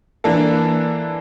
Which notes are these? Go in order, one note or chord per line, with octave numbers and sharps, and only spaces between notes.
E3 A#3 D4 A4